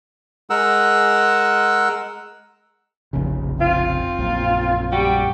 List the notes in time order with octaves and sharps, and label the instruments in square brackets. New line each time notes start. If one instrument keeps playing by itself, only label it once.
[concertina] G#3 A#4 F#5 E6
[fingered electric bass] F1 A#1 C#3
[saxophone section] C4 F4
[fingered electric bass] A#1 F#2
[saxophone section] G3 F#4 G4